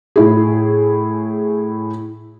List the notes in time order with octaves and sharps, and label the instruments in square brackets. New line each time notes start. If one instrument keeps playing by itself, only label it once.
[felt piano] A2 E4 G#4